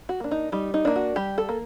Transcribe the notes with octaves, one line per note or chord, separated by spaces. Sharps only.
F#4
A#3 D4
D#4
G3 D#4
D#4
A#3 D4
F#4
G3 G4
A4
A#3